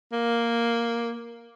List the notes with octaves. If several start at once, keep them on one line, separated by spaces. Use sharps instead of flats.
A#3